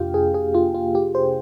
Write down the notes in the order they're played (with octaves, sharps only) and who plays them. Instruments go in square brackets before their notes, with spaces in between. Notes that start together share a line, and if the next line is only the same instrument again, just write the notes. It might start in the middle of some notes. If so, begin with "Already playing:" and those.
Already playing: [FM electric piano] F2 C3 A#3 D4 F4 G4 F5 G5
G#4
G#4
F4
F4
G4
C5